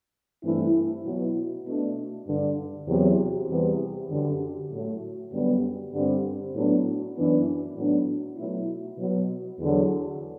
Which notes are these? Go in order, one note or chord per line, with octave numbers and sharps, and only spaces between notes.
G2 E3 A3 C4 E4
B2 F#3 B3 E4
B2 A3 D4
G2 D3 G3 D4
E2 C3 F#3
E2 C3 E3 G3 B3
F#2 D3 G3
A2 F#3 A3
F#2 D3 G3 B3
G2 D3 G3 C4
A2 F#3 B3 D4
F#2 E3 B3 D4
A2 F#3 B3 D4
B2 F#3 A3 E4
B2 F#3 B3
E2 D3 F#3